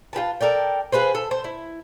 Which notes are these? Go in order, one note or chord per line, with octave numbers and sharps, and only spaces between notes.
F4 G4 B4 A5
A4 A#4 D5 G5
F4 G#4 B4 C5
A4
C5
E4